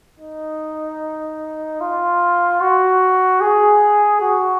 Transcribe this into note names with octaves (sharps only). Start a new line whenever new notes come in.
D#4
F4
F#4
G#4
F#4